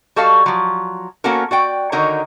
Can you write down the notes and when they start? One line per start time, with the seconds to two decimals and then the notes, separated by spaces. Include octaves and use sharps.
0.16 G3 F#4 A4 D#5 F5
0.46 F3 F#3
1.24 A#3 B3 C#4 F#4 A4 A#4
1.51 F#4 D5 G5
1.92 D3 D#3 D#4 F#4 A#4 C#5